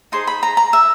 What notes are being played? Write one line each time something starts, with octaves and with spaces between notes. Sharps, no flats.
D#4 G#4 C5 C6
B5
A#5
A#5
E5